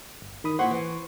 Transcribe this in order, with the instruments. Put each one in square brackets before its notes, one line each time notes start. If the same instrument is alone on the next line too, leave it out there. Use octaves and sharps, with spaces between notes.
[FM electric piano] G1
D#3 B5 D#6
[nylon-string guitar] A#2 E4 F#5 [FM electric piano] C5 C6 C#6
[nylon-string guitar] E3